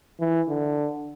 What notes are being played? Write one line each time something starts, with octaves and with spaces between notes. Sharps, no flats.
E3
D3